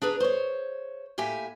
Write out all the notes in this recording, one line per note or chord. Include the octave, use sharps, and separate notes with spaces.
D4 G#4 B4 A#5
C5 C#5
A2 A#3 G4 E5 G#5